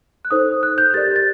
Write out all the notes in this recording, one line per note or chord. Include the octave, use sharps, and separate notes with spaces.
F#6
D#4 A4 C5 D#6
F#6
G6
G4 A#4 D5 A6
A6